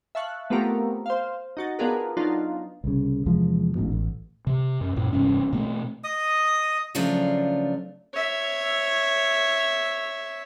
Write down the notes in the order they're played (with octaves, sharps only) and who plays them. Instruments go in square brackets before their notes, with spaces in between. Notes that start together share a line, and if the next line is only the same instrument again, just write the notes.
[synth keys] E5 F5 A5 C#6 F#6
A3 B3 C4 F4 G4 A#4
C5 F5
D#4 F#4 A6
B3 D4 F4 G#4 A#4 B4
F#3 B3 D4 D#4 F4
[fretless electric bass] C2 C#3
E2 C3 F3 G#3
E1 A1 G#2 B2
A1
[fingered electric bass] C3
F#2
F#2 A#2
E1 G2 C3 C#4
B2 A3 C4
[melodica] D#5 D#6
[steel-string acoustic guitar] C#3 F3 F#3 A3 D4 F4
[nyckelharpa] C#5 E5